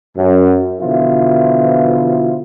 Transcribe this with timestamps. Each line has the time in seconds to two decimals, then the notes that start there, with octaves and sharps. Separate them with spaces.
0.16 F#2
0.80 B2 D3 E3 F3 E4 F4